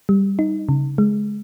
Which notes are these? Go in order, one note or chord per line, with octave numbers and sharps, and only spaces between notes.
G3
D#4
C#3
G#3